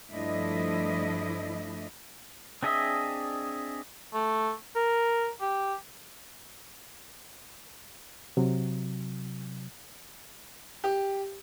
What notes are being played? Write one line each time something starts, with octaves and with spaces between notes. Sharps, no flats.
G2 F3 A3 D4 E4 D#5
C4 D4 G#4 D#5 E5
A3
A#4
G4
C3 F#3
G4